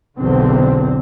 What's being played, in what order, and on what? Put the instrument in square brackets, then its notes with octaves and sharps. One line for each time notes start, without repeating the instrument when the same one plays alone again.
[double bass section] B1 E2 D3 C4